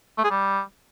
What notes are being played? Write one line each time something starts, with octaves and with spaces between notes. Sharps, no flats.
A3
G#4
G3